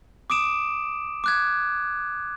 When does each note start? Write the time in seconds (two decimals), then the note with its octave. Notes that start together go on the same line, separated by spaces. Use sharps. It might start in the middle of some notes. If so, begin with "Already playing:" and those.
0.30 D6 D#6 D7 E7
1.24 D6 F#6 G#6